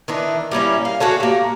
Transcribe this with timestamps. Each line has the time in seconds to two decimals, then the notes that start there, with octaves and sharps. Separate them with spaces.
0.08 D#3 E3 D4
0.51 G3 A#3 C#4 E4
0.85 F5
1.00 F#4 G#4 A4 C#5
1.20 A#3 G4